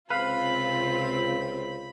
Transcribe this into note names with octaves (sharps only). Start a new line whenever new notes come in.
C#2 C3 C4 F4 B4 F5 B5